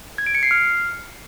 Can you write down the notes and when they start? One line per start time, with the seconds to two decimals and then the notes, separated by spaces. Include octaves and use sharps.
0.18 G#6
0.26 D7
0.35 C#7
0.43 C7
0.51 F6